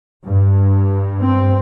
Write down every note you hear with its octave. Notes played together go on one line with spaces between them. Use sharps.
G2
C4